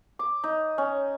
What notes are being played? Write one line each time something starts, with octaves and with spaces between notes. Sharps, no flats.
D6
D#4
C#4